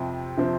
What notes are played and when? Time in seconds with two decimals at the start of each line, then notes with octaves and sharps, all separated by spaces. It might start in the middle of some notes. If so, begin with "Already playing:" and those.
Already playing: F2 C3 F3 C4
0.37 C3 F3 C4